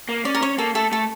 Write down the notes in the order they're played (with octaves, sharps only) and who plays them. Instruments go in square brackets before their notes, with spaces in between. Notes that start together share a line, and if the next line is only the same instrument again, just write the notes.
[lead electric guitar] A#3
[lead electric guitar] C#4 [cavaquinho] D5
[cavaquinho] A#4
[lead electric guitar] C#4 [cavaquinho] C#5
[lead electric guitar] A#3 [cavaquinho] A4
[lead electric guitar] A3 [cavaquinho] A4
[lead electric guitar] A3 [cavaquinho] A4